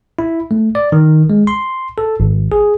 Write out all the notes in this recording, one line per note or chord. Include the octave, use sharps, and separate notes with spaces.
E4
A3
D5
D#3
G#3
C6
A4
G#1
G#4